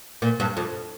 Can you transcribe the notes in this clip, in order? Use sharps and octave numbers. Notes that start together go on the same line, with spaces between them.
A#2
G2
F2